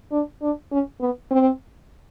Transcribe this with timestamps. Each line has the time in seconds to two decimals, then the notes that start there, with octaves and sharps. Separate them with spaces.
0.12 D4
0.42 D4
0.72 C#4
1.01 B3
1.31 C4